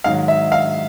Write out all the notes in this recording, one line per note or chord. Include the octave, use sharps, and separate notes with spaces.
G#2 D#3 F#3 F5
E5
F5